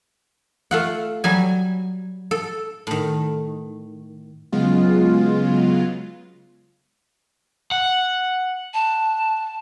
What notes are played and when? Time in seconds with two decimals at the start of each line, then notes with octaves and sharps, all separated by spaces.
0.71 A3 F4 F#5
1.24 F#3 G3 G#5
2.31 A4
2.87 A2 D#3
4.52 C#3 F#3 G#3 B3 F4
7.71 F#5
8.73 A5